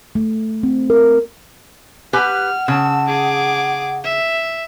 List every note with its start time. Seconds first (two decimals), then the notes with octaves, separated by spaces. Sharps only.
0.15 A3
0.63 C4
0.90 A#4
2.13 G4 B4 F#5 G#5 F6
2.68 C#3 A5 E6
3.07 G#4 D6
4.04 E5